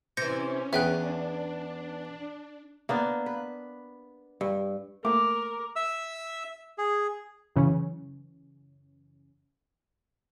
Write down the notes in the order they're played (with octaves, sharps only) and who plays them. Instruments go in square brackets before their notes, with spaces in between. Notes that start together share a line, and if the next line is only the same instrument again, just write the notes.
[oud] C3 E3 [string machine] C#4 [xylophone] G6 A#6 C#7
[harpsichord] E2 [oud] C#4 G#4 [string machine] D4 [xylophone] E5 G5 F#6
[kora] A#3 B3 D4
B4
G2
[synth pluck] A3 A#3 [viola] A#4 [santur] D6
[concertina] E5 E6
G#4
[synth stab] F#2 C#3 E3 C#4